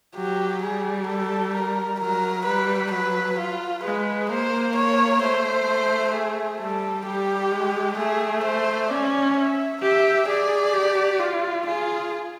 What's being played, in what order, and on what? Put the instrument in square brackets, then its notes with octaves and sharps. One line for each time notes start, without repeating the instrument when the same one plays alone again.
[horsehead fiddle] F#3 [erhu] G4
[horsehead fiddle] G3 [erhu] G#4
[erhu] A4
A#4
[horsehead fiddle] F#3 [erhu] A#4
[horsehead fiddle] G3 [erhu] B4
[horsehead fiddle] F#3 [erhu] B4
[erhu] F4
[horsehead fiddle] G#3 [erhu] B4
[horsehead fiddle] A#3 [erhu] C5
[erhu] C#5
[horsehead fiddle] A3 [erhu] C5
[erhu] G#4
[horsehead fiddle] G3 [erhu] A4
[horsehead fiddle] G3 [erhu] G4
[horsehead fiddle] G#3
[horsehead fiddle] A3 [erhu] G#4
[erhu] C5
[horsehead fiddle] C#4 [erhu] D5
[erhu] E5
[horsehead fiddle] G4 [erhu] E5
[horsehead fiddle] G#4 [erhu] D5
[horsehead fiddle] G4
F4
[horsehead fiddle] F4 [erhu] G#4